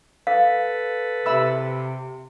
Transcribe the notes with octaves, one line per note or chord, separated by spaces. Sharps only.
A4 B4 F5
C3 E5 B5 E6